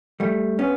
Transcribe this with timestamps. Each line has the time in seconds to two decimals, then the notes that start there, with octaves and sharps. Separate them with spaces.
0.20 G3 A3
0.59 B3 C#4